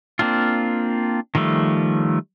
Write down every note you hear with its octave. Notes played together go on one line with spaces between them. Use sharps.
A#3 C4 D4 F4
D#3 F3 G3 A3